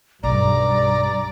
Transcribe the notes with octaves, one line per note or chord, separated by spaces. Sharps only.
B1 G2 D5 A#5